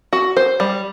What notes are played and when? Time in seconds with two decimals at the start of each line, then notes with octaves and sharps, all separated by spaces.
0.13 F#4
0.37 C5
0.60 G3